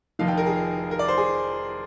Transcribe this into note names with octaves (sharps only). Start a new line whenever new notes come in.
F1 F2 D#3 F5
G5
A#4
G#4
A#4
D5
C5
G#4